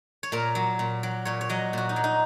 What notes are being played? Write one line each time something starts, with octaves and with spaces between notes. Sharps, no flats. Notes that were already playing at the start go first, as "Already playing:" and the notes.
C#5
A#2 A#4
F#3
A#2
F#3
A#2 C#5
C#5
F#3 D#5
A#2 F#4
D#4
F#3
D#4